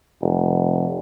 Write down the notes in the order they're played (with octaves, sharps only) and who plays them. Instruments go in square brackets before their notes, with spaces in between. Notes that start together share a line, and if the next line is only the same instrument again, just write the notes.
[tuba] F1